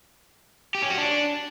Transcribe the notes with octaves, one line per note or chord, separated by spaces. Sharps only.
G4
C#4
F#4
D4